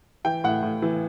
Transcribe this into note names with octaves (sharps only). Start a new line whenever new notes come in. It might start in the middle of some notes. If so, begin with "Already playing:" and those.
E3 G5
A2 F#5
A2
E3